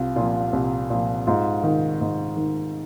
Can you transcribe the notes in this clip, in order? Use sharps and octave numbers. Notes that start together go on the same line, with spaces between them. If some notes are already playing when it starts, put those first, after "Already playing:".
Already playing: C2 F4
A#2 F3 F4
C2
A#2 F3
G#2 F4
D#3
G#2
D#3